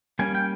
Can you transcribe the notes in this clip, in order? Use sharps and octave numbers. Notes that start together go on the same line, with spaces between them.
G3 A#3 C#4 G#5
G5